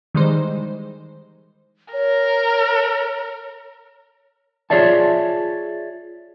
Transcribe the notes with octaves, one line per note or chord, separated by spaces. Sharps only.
D#3 E3 G3 G#3 D#4 C5
A#4 C#5
F4 G#4 C#5 D5 E5 A5